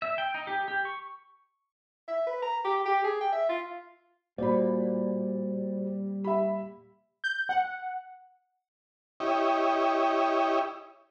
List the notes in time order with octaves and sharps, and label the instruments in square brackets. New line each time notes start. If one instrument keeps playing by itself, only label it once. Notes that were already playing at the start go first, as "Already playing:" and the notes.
[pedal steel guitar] E5
G5
D#4
G4
G4
C#6
[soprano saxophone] E5
B4
A#5
G4
G4
G#4
G5
E5
F4
[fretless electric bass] A#2 [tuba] G3 [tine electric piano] F#4 C5 [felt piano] D5 B5
[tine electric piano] G4 [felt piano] E5 B5
[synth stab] G6
F#5
[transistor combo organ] E4 G4 C#5 D#5